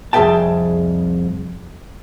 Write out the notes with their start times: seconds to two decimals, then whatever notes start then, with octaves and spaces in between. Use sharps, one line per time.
0.13 C2 F2 G#4 E5 G5 A5